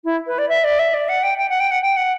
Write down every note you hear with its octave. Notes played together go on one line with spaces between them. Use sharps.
E4
B4
D5
E5
D5
E5
D5
F#5
G5
G5
F#5
G5
F#5
G5
F#5